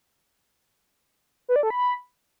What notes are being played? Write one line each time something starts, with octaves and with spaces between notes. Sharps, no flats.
B4
D5
A4
B5